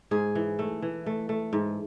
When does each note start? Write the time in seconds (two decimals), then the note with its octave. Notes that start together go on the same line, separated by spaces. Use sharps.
0.11 G#2 G#4
0.35 E3
0.59 A3
0.82 E3
1.06 A3
1.29 A3
1.53 G#2